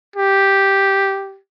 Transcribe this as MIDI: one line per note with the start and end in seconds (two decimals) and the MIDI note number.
0.16 1.39 67